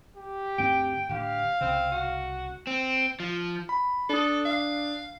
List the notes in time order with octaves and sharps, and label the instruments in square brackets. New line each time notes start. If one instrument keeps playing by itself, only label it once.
[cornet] G4
[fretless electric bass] D2 G2 C4 [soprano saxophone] G5
[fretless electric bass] A2 D3 [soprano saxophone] G4 [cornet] F5
[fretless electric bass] C2 C#3 [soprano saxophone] C4
[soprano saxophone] F#4
[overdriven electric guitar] C4
F3
[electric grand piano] B5
[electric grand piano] D4 D#6 [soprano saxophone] A4
[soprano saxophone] F5